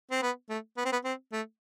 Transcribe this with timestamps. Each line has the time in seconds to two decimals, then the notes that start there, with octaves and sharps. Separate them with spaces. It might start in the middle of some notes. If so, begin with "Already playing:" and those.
0.11 C4
0.22 B3
0.50 A3
0.77 B3
0.85 C4
0.92 B3
1.05 C4
1.33 A3